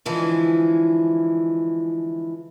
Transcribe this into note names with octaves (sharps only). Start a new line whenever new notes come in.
D3 E3 F3 G#3 E4